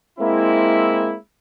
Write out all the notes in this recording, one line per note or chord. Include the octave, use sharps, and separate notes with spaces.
G#3 A#3 C4 E4